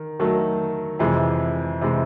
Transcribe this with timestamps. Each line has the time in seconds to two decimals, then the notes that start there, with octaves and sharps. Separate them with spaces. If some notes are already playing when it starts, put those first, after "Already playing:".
Already playing: D#3
0.20 D#3 F#3 A3
0.99 F2 C3 E3 G#3
1.81 C3 E3 G#3